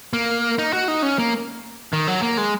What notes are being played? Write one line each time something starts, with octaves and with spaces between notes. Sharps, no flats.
A#3
D#4
F#4
D#4
C#4
A#3
D#3
F#3
A#3
G#3